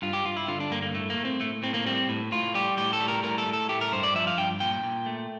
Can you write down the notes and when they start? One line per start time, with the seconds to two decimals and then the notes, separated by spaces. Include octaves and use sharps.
0.02 G2 F4
0.13 G4
0.25 G2 F4
0.37 E4
0.48 D3 F4
0.60 D4
0.71 G2 A#3
0.82 A#3
0.95 A2 A3
1.10 A#3
1.17 A3
1.25 C4
1.40 A2 A3
1.63 A2 C4
1.74 A#3
1.86 G3 C4
2.09 A2
2.32 A2 F4
2.54 G3 G4
2.78 A2 G4
2.93 A4
3.00 G3
3.08 A#4
3.23 A2 A#4
3.38 A4
3.46 A2
3.53 A4
3.69 A3 G4
3.81 A#4
3.92 G2 C5
4.03 D5
4.15 F3 E5
4.27 F5
4.38 G2 G5
4.60 A#2 G5
4.83 A#2
5.06 A3